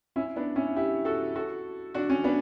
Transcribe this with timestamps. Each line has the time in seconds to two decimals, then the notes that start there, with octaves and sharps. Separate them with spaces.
0.16 C#4 E4
0.36 B3 D4
0.56 C#4 E4
0.76 E4 G4
1.05 F#4 A4
1.36 F#4 A4
1.95 D4 F#4
2.10 C#4
2.24 B3 D4